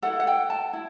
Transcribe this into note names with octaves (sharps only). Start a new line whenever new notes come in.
E4 A4 F#5
F#5
G5
A5
E4